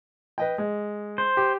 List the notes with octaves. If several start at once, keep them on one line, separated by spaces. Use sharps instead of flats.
B4 D#5 G5
G#3
C5
G4